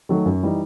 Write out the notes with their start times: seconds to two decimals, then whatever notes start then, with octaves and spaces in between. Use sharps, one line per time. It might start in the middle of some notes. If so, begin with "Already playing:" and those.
0.09 D#3 F#3 A3
0.26 F#2
0.43 E3 G3 D#4